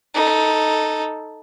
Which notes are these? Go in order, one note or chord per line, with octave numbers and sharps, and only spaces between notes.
D#4 A4